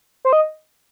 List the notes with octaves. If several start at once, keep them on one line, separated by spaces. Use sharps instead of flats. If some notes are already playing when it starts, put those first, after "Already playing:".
C5
D#5